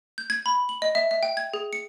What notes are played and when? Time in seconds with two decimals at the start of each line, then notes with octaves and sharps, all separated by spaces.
0.18 G6
0.30 G#6
0.46 B5
0.69 F#7
0.82 D#5
0.95 E5
1.11 E5
1.23 G5
1.37 G#6
1.54 G#4
1.73 C#7